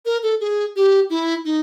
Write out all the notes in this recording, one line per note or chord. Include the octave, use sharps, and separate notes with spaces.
A#4
A4
G#4
G4
E4
D#4